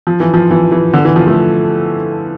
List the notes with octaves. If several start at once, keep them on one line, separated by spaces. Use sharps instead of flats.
F3
E3
F3
E3
E3
D3
E3
F3
A3